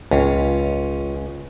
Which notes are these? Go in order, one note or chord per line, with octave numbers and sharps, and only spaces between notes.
C#2 C#4 F4